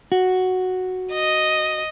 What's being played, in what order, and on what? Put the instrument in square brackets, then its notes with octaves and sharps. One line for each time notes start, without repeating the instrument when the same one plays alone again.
[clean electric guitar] F#4
[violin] D#5